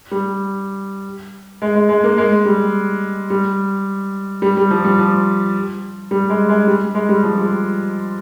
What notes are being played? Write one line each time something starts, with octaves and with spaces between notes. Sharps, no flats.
G3
G#3
G#3
G#3
A#3
G#3
G3
G3
G3
G3
F3
G3
F3
G3
G#3
G#3
G3
G#3
G3
F3
G3